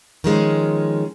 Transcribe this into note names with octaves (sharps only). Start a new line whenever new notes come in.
D#3 F3 G#3 C#4